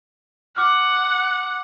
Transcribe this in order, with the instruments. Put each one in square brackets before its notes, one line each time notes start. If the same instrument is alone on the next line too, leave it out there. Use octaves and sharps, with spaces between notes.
[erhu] F#5 [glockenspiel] D6 F6